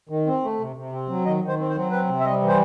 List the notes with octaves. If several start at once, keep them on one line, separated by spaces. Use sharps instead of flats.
D#3
C4
A3
C3
C3
C4
F#3
D#3 D#5
D#3
C5
C4
C5
F#3
C4 B4
C3
E5
G3 D#5
E3
C5